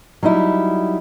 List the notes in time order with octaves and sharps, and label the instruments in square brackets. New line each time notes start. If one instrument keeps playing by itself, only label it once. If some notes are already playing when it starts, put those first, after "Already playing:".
[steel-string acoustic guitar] F#3 G3 D#4 E4